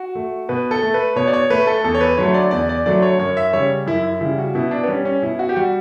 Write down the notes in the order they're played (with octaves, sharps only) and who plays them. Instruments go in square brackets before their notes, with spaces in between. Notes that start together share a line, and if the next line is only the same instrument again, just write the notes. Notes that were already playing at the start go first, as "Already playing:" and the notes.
Already playing: [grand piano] F#4
A3
B2 B4
A4
A3
B4
B2 C#5
D5
C#5
A3 B4
A4
E2 A4
C#5
B4
D3 F#3 A3 C#5
D5
E2 D5
D5
D3 F#3 A3 D5
C#5
F#2 C#5
E5
C#3 G3 C#5
F#2 E4
E4
C#3 G3 E4
F#4
B2 E4
D4
B3
G3 C#4
C#4
B2 E4
F#4
G4
G3 F#4